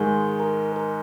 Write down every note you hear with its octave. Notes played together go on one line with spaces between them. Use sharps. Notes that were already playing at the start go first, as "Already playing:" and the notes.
Already playing: G#2 D#3 G#3 G#4
A#4
A#4